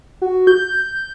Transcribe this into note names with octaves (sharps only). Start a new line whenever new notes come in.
F#4
G6